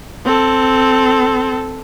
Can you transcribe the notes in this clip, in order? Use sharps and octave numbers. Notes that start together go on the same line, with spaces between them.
C4 A4